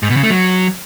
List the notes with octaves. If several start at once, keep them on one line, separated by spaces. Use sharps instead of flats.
G#2
B2
C#3
A3
F#3